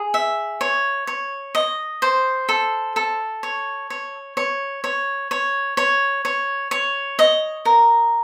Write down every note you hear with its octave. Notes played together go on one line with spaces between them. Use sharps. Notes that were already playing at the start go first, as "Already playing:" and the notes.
Already playing: G#4
E5
C#5
C#5
D#5
C5
A4
A4
C#5
C#5
C#5
C#5
C#5
C#5
C#5
C#5
D#5
A#4